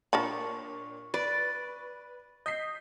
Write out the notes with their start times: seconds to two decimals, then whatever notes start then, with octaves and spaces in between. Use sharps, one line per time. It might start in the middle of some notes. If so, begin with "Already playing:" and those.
0.13 A#2 D4 A#4 C#5 A5 B5 C#6
1.14 B4 D5
2.46 D#5 G6 B6 C7